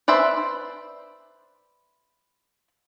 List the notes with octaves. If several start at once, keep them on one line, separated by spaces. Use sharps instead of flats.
B4 C5 D5 E5